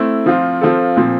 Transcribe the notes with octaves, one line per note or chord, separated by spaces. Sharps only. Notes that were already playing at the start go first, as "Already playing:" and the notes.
Already playing: A3 C4 E4
F3 C4 F4
F3 C4 F4 A4
A#2 F3 C4